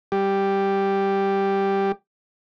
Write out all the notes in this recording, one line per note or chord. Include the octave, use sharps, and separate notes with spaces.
G3 G4